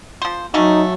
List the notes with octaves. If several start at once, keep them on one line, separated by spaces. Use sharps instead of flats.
F3 C5
F#3 A3 A#3 C#4 D#4